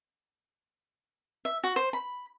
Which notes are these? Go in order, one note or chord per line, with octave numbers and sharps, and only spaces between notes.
E5
F#4
C5
B5